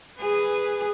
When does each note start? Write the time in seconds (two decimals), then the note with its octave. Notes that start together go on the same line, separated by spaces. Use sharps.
0.19 G#4 B4